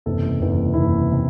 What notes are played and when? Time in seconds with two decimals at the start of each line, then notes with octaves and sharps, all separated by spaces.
0.06 F#1 E2 C3 A4
0.40 F#1 E2 C3
0.74 F#1 E2 C3 E4
1.11 C3